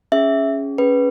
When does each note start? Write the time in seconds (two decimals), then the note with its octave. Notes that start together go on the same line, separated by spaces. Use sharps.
0.12 C#4 G#4 E5
0.78 C#4 G#4 B4